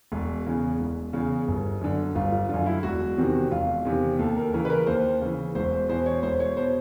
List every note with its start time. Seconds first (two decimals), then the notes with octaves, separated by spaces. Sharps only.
0.12 E1
0.46 E2 C#3
0.80 E1
1.13 E2 C#3
1.48 G1
1.81 F#2 D3
2.15 G1 F4
2.32 F4
2.49 F#2 D3 F4
2.66 E4
2.83 E1 F#4
3.18 E2 C3 D#3
3.51 E1 F4
3.85 E2 C3 D#3
4.19 D#2 A4
4.37 A#4
4.53 C#3 E3 A#4
4.65 B4
4.70 A#4
4.87 D#2 C5
5.21 C#3 E3
5.55 E1 C5
5.73 C5
5.89 E2 B2 C5
6.06 C#5
6.23 E1 C5
6.40 C#5
6.57 B2 C5